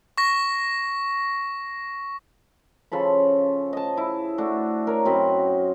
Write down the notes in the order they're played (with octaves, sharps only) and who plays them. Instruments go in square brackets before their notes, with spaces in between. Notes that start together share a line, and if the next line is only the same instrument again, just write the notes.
[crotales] C#6 A#6
[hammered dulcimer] C#3 F3 A4 B5
D#5 A5
E4
A3 D4 F#4
A#4 C#5
F#2 C4 D#5 B5